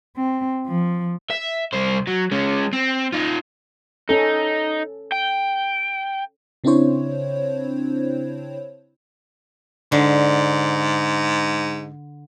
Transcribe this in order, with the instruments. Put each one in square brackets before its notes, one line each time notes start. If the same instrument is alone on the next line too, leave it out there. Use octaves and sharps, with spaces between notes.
[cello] C4
F3
[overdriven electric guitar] E5
C2 C5
F#3
G#3 C#4
C4
D#4 F4
[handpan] C#4 A4 [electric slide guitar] D#4
[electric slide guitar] G5
[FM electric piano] C#3 C4 D4 E4 C5 C#5
[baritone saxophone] G#2 [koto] D3